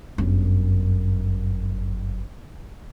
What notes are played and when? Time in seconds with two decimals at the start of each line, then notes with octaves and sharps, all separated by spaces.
0.18 G1 F#2